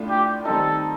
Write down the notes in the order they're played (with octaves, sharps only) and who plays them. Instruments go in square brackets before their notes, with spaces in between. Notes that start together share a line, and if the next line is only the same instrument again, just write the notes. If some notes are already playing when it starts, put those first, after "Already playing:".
Already playing: [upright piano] A2 A3 D4 F4
[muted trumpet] G4
[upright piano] D#3 G3 C4 D#4 [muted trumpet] A4